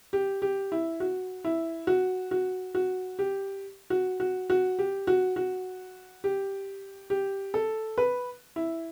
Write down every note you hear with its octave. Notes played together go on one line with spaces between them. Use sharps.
G4
G4
E4
F#4
E4
F#4
F#4
F#4
G4
F#4
F#4
F#4
G4
F#4
F#4
G4
G4
A4
B4
E4